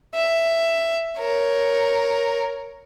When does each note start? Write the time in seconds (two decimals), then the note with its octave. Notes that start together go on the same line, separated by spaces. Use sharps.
0.14 E5
1.19 A#4 C#5